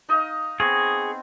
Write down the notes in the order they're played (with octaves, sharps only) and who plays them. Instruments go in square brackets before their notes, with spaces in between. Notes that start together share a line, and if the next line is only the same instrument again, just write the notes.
[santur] D#4 D#5 F5
[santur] B3 C4 [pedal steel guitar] G#4 C#6